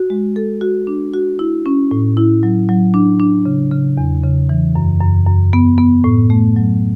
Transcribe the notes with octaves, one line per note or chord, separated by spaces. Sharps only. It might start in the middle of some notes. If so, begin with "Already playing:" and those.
Already playing: F#4
G#3
A4
F#4
D4
F#4
E4
C#4
A2
E4
F#3
F#3
D4
D4
C#3
C#3
E2
C#3
E3
F#2
F#2
F#2
B3
B3
A2
A3
F#3